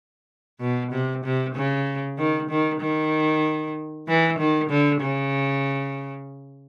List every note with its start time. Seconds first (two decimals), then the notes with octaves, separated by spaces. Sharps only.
0.60 B2
0.92 C3
1.24 C3
1.55 C#3
2.18 D#3
2.50 D#3
2.81 D#3
4.08 E3
4.39 D#3
4.70 D3
5.01 C#3